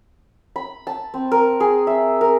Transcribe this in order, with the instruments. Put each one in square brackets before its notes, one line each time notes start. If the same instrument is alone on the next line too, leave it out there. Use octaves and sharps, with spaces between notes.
[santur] B5
A5
C4
A#4
G#4
E5
A#4